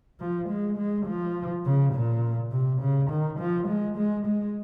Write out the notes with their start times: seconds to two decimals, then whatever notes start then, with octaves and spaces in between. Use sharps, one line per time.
0.20 F3
0.49 G#3
0.78 G#3
1.07 F3
1.66 C#3
1.94 A#2
2.52 C3
2.81 C#3
3.10 D#3
3.39 F3
3.68 G#3
3.97 G#3
4.26 G#3